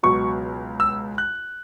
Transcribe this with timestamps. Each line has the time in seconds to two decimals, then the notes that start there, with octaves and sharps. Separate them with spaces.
0.03 C#2 B2 F#3 C#6
0.80 E6
1.18 F#6